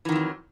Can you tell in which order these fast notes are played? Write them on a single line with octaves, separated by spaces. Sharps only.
E3 D#3 F2 F#3